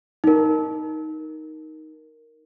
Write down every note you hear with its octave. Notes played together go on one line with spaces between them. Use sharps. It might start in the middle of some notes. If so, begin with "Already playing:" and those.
D#4 A#4